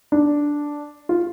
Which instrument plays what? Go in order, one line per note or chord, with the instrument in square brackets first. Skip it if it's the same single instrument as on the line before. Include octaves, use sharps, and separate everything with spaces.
[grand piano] D4
F4